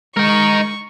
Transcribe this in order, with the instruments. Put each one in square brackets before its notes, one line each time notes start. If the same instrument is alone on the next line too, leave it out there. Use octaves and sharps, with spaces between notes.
[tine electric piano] G#3 [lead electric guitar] D#4 A#4 [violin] C#6